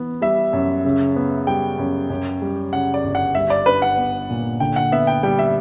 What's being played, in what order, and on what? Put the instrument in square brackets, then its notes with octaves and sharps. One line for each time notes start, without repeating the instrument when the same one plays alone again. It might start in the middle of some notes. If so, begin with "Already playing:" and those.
Already playing: [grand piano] E3 B3
[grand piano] G3 [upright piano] E5
[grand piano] F#2
C#3
B3
[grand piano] G3 [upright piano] G5
[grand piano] F#2
F#2
G3
[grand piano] C#3 [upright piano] F#5
[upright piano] D5
[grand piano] G1
[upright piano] F#5
[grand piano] G3 [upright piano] E5
[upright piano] D5
[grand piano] D4 [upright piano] B4
[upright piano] F#5
[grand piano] B3
A#2
[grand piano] D3 [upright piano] G5
[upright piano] F#5
[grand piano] B3 [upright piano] E5
[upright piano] G5
[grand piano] G3 [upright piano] G5
[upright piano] E5